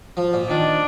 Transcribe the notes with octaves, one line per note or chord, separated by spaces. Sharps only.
F3
A#2
D#3 D4